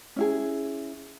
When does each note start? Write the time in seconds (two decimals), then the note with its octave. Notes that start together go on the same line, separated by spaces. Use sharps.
0.16 C#4 E4 G#4